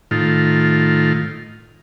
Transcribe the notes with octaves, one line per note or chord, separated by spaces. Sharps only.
A2 D#3 F4